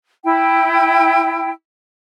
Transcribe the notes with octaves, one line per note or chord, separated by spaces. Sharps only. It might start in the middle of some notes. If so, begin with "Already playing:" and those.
E4 G5